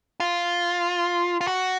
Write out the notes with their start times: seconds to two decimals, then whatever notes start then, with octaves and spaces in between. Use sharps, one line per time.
0.20 F4
1.41 F4
1.47 F#4